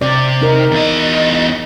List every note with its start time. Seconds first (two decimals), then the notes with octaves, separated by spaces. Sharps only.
0.01 C3 D5
0.42 D#4 A#4
0.71 E2 D#5